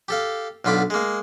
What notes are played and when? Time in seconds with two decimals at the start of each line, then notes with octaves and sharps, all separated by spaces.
0.08 G4 A4 F5
0.65 B1 D3 F4 B5 D6
0.90 G#3 A#3